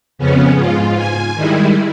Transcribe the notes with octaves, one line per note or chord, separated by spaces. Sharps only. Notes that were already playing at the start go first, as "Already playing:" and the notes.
F2 C#3 B3 C#4
G#2 F4
G#5
D#3 G3 G#3 E4